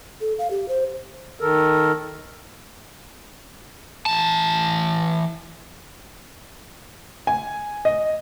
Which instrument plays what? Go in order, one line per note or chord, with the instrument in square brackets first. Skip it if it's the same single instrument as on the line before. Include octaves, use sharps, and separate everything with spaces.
[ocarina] A4
F5
G4
C5
[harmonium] D#3 A4 A#4
[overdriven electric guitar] E3 A5
[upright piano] G#5
D#5